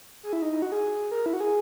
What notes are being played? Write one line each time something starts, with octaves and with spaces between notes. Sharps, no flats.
G#4
E4
D#4
D#4
F#4
G#4
A#4
E4
F#4
G#4